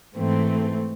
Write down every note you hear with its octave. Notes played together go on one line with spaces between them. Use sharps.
G#2 E3 A3 C4